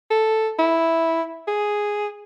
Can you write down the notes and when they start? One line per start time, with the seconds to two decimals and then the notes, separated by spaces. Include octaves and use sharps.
0.11 A4
0.59 E4
1.48 G#4